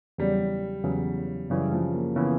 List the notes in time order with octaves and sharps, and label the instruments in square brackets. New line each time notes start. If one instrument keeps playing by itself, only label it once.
[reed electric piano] E2 C#3 F#3 [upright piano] G3
[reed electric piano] E2 C#3 F#3
[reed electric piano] F#2 C#3 E3 [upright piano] G3
[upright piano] F3
A#3
[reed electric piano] C#3 E3 [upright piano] B3